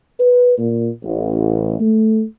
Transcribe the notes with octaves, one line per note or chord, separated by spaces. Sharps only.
B4
A#2
A1
A3